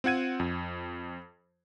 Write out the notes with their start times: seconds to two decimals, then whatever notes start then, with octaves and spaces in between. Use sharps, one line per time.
0.04 C4 F4 F#5 G#6 D#7
0.40 F2